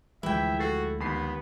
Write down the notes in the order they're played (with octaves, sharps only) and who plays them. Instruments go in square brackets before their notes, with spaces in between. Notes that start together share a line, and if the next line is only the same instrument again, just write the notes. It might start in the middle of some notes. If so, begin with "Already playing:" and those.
[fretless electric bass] D2 F3 G#3 [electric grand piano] E3 [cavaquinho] E4 G5 [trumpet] E5
[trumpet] F#4 [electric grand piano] A4 A6 C7
[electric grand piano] D#2 B5 C7 [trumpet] B3